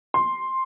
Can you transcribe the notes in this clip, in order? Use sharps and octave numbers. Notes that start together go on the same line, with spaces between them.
C6